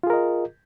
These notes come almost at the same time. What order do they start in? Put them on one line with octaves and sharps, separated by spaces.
F4 G#4 A#4 D#5